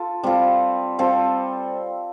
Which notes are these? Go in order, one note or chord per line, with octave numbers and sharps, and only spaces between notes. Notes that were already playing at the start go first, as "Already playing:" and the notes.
Already playing: F4 A4
G3 C4 F4 A4
G3 C4 F4 A4